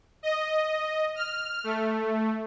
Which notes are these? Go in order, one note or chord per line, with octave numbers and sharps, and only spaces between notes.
D#5
F6
A3